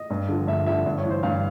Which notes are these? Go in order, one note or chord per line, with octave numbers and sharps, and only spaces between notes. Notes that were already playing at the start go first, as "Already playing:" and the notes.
Already playing: D#5
G2
D3 F3
G2 E5
D3 F3 E5
G2
C#5
E3
C5
G2 F5